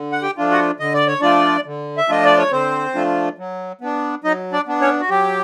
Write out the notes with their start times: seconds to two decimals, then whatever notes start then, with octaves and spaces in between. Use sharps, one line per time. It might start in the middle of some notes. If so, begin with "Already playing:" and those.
Already playing: D3
0.12 F#5
0.22 G4 G5
0.37 F3 A3 D4 F4
0.51 F#4 F#5
0.80 D3 D#5
0.94 D5
1.07 C#5
1.21 F3 A3 D4 F4 D5
1.66 D3
1.97 E5
2.09 F3 A3 D4 F4 D#5
2.25 D5
2.38 C#5
2.52 D3 C4 C5
2.95 F3 A3 D4 F4
3.38 F#3
3.81 B3 D4
4.24 F#3 D#4 D#5
4.52 D4 D5
4.67 B3 D4
4.81 C#4 C#5
5.00 F#4
5.10 F#3 G4